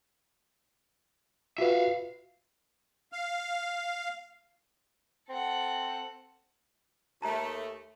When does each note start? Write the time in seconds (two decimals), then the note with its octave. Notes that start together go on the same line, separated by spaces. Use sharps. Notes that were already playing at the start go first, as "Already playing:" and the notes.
1.58 F4 F#4 B4 E5 F5
3.12 F5
5.29 C4 A4 F#5
7.22 D#2 A3 A5 A#5